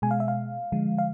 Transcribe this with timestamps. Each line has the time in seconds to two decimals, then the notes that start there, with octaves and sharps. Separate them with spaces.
0.02 B2 G#3 G#5
0.11 F5
0.20 E5
0.28 F5
0.72 D3 F3 G#3
0.98 F5